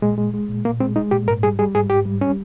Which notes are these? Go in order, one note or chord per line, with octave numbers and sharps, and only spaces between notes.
A#2 G#3
G#3
G#3
A#2
A#2 A#3
G#3 C4
G#3 D#4
A#2 G4
G#2 A#4
G3 G#4
G3 G#4
G#2 G#4
G#2 G4
G3
G3 C#4